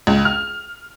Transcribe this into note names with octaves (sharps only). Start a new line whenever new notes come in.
C#2
F6